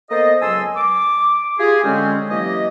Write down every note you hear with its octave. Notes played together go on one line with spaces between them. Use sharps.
A#3 B3 A4 C5 D#5
C#2 F#3 G#5 A5 C6 E6
D6
F4 G4 G#4
D3 G#3 C4 C#4
E3 F#3 A#3 G4 D#5